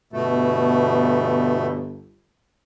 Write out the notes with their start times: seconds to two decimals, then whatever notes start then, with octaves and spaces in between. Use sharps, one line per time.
0.13 G1 B2 A3